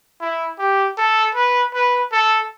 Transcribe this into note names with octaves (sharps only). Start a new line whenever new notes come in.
E4
G4
A4
B4
B4
A4